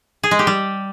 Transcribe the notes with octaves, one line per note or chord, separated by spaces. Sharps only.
G#4
G#3
G4
G3